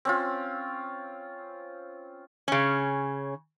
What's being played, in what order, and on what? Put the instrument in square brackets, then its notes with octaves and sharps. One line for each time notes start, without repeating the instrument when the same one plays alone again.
[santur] C4 C#4 F4
[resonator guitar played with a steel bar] C#3 C#4